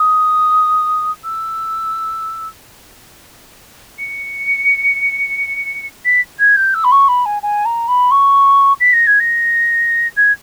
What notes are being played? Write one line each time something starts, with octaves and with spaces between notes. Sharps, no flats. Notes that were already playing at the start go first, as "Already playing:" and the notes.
Already playing: D#6
E6
C#7
B6
G#6
G6
E6
B5
C#6
B5
G#5
G#5
A#5
B5
C#6
B6
A#6
G#6
A#6
G#6